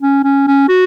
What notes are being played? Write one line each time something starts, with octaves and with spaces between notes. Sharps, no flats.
C#4
C#4
C#4
F#4